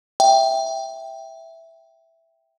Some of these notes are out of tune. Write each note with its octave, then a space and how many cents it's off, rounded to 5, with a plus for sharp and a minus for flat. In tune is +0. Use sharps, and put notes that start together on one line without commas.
E5 +0 G5 +0